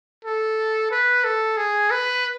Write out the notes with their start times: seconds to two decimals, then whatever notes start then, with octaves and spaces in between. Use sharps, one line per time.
0.25 A4
0.91 B4
1.24 A4
1.57 G#4
1.91 B4